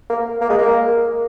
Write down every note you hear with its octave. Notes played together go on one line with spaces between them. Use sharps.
A#3
A#3
G#3
A#3